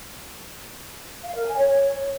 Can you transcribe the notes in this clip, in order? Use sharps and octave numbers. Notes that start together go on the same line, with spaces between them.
F5
A#4
G#5
C#5